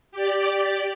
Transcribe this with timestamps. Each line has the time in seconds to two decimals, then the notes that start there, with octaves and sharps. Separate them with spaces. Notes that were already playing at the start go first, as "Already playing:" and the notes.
0.12 G4 D5